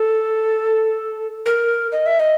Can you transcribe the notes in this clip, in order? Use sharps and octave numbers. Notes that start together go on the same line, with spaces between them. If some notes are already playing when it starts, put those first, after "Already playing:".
Already playing: A4
A#4
D#5
E5
D#5